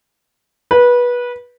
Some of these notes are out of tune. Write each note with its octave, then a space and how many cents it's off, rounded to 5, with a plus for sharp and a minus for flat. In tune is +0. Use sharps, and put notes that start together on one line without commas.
B4 -20